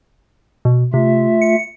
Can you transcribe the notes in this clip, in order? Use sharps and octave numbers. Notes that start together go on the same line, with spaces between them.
B2
C3 A3 F4 E5
C#7